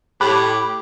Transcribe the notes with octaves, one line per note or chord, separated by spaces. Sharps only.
A2 G4 B5 D6 F#6